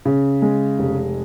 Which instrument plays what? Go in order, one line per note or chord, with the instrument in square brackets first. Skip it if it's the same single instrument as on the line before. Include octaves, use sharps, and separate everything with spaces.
[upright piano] C#3
G#3
F1